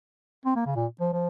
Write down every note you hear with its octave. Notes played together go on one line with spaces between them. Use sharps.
C4
A#3
C#3
A#2
F3
F3